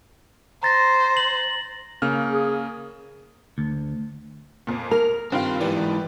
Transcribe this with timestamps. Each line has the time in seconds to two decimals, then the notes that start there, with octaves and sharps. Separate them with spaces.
0.63 C5 A#5 A6 A#6
1.17 F#7
2.02 C#3 A#3 F6
2.31 G#4
3.58 D2
4.67 F2 A#2
4.91 A#4 F7
5.32 G2 D#3 C4 F4
5.60 G#2 E3 G4 B4 D5